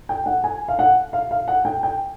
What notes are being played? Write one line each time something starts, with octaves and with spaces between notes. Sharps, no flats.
G5
F#5
G#5
F5
F#5
F5
F5
F#5
G5
G5